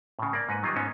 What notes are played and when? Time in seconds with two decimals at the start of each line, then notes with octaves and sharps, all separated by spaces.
0.19 A2 C#3
0.33 A#3 D5
0.49 G#2 B4 D#5 F#5
0.63 D#3 F#3 G3 A#3 F4
0.76 G#2 B3 C#4 D#4